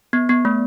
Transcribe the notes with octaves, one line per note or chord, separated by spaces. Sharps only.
B3
B3
A3